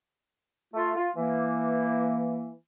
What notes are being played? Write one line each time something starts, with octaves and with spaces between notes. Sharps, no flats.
A3 F4
F4
E3 A#3